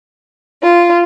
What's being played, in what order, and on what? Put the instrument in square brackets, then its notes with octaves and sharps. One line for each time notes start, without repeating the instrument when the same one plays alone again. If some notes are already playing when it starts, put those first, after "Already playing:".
[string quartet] F4